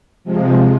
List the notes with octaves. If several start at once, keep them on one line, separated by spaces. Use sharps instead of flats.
C3 F3 G#3